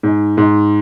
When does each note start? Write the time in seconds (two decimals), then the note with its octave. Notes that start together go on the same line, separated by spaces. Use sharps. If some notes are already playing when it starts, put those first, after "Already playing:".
0.03 G#2
0.37 G#2